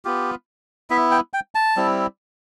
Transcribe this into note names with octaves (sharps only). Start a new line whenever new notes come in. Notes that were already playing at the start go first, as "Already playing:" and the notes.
B3 F4 G4
B3 E4 E5
G5
G5
A5
G3 C4 E4